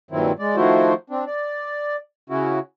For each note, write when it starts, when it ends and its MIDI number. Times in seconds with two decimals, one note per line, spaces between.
0.11 0.32 43
0.11 0.32 46
0.11 0.32 51
0.11 0.32 54
0.11 0.32 60
0.11 0.32 64
0.39 0.56 56
0.39 0.56 74
0.56 0.94 51
0.56 0.94 53
0.56 0.94 57
0.56 0.94 64
0.56 0.94 66
0.56 0.94 72
1.10 1.24 60
1.10 1.24 62
1.27 1.96 74
2.30 2.59 49
2.30 2.59 61
2.30 2.59 64
2.30 2.59 66